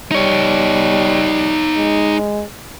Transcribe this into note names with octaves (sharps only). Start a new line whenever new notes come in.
G3 D#4 C#5
G#3